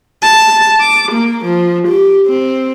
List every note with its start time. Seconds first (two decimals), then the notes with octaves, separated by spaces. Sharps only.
0.23 A5
0.80 D6
1.12 A#3
1.45 F3
1.87 G4
2.26 C4